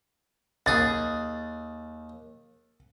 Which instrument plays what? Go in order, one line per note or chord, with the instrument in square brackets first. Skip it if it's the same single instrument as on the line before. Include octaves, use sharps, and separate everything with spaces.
[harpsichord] D#2 G#4 [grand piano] A6